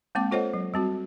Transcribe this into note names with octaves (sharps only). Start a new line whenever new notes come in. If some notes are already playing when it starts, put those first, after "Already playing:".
G#3 A#3 C4 D6
F4 A4 C5 C#5 D#5 F#5
F#3
G3 C4 F#4